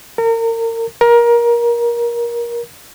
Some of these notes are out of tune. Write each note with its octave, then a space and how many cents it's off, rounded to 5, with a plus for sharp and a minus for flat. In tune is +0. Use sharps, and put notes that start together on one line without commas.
A#4 -35
A#4 +20